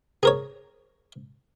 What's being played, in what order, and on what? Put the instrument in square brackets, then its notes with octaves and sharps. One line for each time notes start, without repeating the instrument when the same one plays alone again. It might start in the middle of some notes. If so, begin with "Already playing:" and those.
[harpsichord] G#4 A#4 C#5